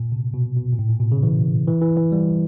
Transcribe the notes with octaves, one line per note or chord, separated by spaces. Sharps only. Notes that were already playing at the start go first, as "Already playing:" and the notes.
Already playing: A#2
C3
B2
B2
A#2
A2
A#2
B2
C#3
E3
E3
E3
E3
G3